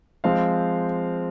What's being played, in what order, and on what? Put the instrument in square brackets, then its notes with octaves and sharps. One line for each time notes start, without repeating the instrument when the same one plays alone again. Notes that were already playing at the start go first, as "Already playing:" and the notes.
[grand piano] F3 G#3 C4 F5